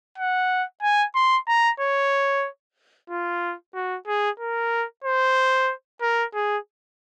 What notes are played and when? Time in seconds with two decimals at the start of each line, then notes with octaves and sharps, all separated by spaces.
0.18 F#5
0.82 G#5
1.15 C6
1.48 A#5
1.80 C#5
3.10 F4
3.75 F#4
4.07 G#4
4.40 A#4
5.04 C5
6.02 A#4
6.35 G#4